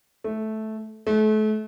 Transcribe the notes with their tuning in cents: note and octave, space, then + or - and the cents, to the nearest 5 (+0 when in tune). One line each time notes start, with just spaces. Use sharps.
A3 -10
A3 -35